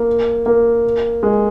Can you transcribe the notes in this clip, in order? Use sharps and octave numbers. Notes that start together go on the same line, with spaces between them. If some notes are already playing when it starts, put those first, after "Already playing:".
Already playing: A#3
A#3
G#3